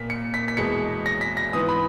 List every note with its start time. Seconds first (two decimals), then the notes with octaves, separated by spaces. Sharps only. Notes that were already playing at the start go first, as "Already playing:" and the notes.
Already playing: A#2 A#3 B6
0.10 C#7
0.34 B6
0.48 B6
0.57 E2 B2 G#3 C#7
1.06 A#6
1.21 B6
1.37 A#6
1.53 G#2 E3 B3 D#6
1.69 B5